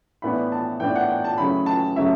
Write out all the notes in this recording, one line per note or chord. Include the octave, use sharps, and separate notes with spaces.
A2 E3 B3 D4 B5
A5
A2 E3 B3 D4 G5
F#5
G5
A5
C#3 F#3 A3 C#4 E4 B5
A5
C#3 F#3 A3 C#4 E4 E5